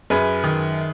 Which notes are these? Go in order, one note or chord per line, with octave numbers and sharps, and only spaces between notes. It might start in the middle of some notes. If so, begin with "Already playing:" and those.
F#2 G#4 B4
D#3